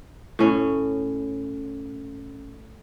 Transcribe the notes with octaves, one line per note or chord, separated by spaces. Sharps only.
A2 C#4